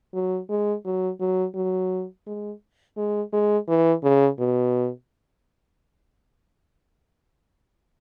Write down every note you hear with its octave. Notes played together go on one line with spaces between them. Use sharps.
F#3
G#3
F#3
F#3
F#3
G#3
G#3
G#3
E3
C#3
B2